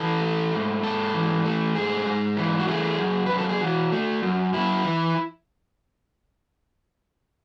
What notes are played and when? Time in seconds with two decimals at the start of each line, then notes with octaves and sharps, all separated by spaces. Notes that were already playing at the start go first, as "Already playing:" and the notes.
Already playing: E3 A4
0.21 A3
0.52 G#2
0.83 G#2 A4
1.14 E3
1.45 A3
1.75 G#2 G#4
2.06 G#2
2.37 E3
2.60 F#4
2.68 A3 G#4
2.99 F#2
3.26 F#2 B4
3.38 A4
3.49 G#4
3.61 E3 F#4
3.92 A3
4.22 F#2
4.54 F#2 E4
4.85 E3